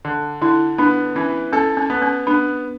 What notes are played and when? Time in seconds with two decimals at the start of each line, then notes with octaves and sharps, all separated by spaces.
0.05 D3
0.41 D3 E4
0.78 B3 D4
1.15 E3 C#4
1.53 C#4 A4
1.77 C#4
1.90 B3
2.02 C#4
2.27 B3 D4